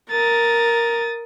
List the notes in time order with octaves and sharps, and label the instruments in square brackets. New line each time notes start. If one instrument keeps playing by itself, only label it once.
[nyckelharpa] A#4 [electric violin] D#6 A6